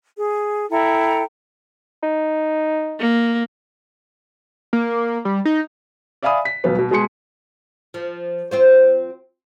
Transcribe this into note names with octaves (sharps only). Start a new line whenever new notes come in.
G#4
E4 A4 G5 A#5
D#4
A#3
A#3
G3
D#4
D5 E5 F5 G#5 B5 D#6
B6
D#1 B1 B2 B3
B2
B2 G#3 G#4 C6 C#7
F3
C4 F4 C5